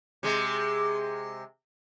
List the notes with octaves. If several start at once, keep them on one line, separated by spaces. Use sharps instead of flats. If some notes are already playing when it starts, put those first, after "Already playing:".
C3 G#3